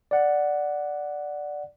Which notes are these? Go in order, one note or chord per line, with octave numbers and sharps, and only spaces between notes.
D5 F#5